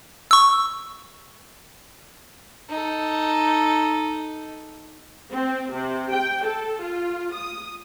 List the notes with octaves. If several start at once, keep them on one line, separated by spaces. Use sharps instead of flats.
C#6 E6
D#4 A4
C4
C3
G5
A4
F4
D#6